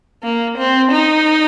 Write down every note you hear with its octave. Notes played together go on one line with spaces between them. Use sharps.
A#3
C4
D#4